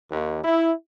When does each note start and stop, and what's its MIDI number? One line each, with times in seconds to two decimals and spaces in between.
0.11 0.41 39
0.44 0.72 64